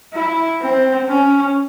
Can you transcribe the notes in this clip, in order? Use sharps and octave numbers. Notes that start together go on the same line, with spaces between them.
E4
C4
C#4